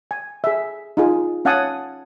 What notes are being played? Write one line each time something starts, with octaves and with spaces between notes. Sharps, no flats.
G#5
G#4 E5
D#4 F4 G#4
C#4 F5 F#5 G#5 A5 D#6